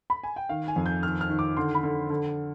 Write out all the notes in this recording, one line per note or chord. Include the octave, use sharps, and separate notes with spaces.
B5
G#5
G5
D#3 F5
G#5
F2
G6
D#3 F6
F6
D#3
D6
D3 C6
B5
D3
D3